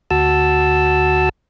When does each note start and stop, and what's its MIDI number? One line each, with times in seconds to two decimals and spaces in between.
0.11 1.29 38
0.11 1.29 66
0.11 1.29 81
0.11 1.29 88